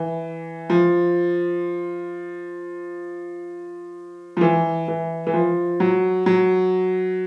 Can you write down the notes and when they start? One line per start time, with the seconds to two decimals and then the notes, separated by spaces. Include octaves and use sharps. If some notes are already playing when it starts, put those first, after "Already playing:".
Already playing: E3
0.70 F3
4.37 F3
4.41 E3
4.88 E3
5.27 E3
5.34 F3
5.80 F#3
6.26 F#3